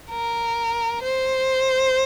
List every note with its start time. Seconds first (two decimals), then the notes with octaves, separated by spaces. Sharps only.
0.11 A#4
1.03 C5